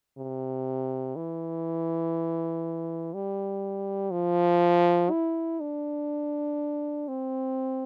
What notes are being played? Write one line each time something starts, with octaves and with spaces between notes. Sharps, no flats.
C3
E3
G3
F3
E4
D4
C4